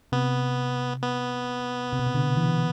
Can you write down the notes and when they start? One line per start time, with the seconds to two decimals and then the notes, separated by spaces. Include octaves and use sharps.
0.12 C3 B3
1.03 B3
1.93 C3
1.99 B2
2.06 C3
2.15 D3
2.37 E3